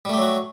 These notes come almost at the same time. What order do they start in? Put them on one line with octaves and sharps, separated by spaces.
G3 A3 G4 F#3 F#4